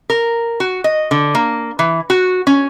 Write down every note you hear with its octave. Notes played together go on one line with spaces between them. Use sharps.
A#4
F#4
D#5
D3
A#3
E3
F#4
C#4